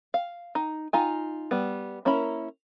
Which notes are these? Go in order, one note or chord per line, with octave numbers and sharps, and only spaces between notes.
F5
D#4
D#4 F4 G#5
G3 B3
A#3 C#4 E4 A#4 B5